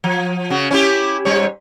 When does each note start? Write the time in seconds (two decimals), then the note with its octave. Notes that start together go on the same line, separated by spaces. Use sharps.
0.04 F3
0.50 C#3 F#4
0.71 C#4 E4 G4
1.25 G#2 G3 C#5